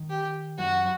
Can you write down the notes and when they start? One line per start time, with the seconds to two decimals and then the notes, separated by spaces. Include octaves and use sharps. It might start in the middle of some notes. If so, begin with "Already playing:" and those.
Already playing: D#3
0.10 G4
0.58 F#2 F#3 F#4